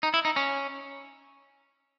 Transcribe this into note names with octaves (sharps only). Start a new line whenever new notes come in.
D#4
E4
D#4
C#4